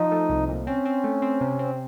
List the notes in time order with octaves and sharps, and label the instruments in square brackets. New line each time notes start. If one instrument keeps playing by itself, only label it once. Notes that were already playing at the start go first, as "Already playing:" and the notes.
Already playing: [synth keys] F3 [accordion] D#4
[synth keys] A3
C2
A#2
[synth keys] C4 [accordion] C#4
[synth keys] C4
A3
C4
C3
C4